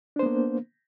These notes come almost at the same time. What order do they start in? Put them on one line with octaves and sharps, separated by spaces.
D4 C5 B3 A#3